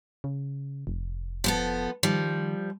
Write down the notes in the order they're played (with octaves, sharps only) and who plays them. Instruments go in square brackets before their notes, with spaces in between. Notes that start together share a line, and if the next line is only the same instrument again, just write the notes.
[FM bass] C#3
F1
[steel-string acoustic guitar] F3 B3 A4
[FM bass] D#3 [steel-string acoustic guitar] F3 G3